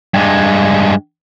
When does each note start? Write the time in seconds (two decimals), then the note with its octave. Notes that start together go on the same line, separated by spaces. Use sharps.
0.14 G2 G#3